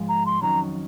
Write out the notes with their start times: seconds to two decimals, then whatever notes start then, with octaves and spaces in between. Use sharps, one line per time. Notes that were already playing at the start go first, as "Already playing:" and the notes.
Already playing: G#2 F3 G#3
0.09 A#5
0.26 C6
0.42 F2 C3 D#3 F#3 C#4 A#5